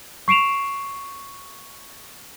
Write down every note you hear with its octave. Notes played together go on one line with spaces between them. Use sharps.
C#6 C7 D7 E7 F7